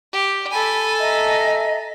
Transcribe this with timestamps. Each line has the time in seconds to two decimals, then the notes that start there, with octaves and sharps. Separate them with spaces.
0.13 G4
0.51 A4 G#5 B5
1.00 D#5 E5 A#5